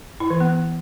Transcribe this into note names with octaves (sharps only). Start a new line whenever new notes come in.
E4
E3
B3